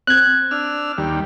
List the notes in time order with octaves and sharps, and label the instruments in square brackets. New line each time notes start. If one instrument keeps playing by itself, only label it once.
[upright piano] C4 [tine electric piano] F#6 G#6
[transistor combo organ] D4 E6 F6
D#2 G3